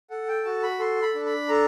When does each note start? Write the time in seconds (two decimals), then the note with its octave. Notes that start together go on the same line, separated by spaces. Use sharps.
0.10 A4 F#5
0.28 G5
0.44 F#4 A5
0.63 B5
0.79 A4 C6
1.02 B5
1.15 D4
1.26 B5
1.49 A4 A#5